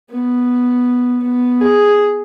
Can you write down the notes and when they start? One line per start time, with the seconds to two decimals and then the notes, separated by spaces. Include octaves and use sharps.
0.10 B3
1.23 B3
1.61 G#4